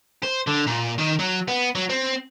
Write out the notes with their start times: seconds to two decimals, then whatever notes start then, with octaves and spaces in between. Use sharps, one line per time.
0.23 C5
0.47 D3
0.67 A#2
0.99 D#3
1.19 F#3
1.48 B3
1.75 F#3
1.90 C4